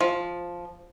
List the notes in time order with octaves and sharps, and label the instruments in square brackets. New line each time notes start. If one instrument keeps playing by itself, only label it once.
[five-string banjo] F3